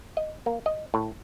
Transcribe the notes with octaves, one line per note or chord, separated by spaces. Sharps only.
D#5
A#3
D#5
A2